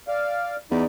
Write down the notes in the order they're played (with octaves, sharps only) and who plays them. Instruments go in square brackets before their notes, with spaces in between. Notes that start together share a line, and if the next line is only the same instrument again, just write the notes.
[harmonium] D5 F5
[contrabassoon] E2 [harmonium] D#4 D5